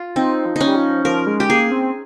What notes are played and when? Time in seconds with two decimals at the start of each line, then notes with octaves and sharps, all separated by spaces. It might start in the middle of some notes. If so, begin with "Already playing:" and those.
Already playing: F4
0.16 C4 D#4
0.46 F3
0.56 C#4 D#4
0.67 G3
0.76 F3
1.05 F3 A#4
1.27 G#3
1.40 G4
1.50 A#3 G#4
1.71 C4